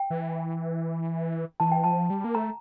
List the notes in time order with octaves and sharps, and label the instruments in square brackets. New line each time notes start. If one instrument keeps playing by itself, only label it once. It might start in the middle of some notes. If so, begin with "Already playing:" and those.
Already playing: [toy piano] G5
[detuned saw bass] E3
[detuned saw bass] E3 [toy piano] A5
[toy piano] G5
[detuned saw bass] F3 [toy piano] A5
[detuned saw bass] G3
A#3
[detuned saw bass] A3 [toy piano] A#5